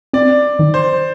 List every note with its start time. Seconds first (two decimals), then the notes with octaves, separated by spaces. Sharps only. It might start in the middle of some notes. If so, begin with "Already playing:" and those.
0.13 C4 D5
0.59 D#3
0.74 C5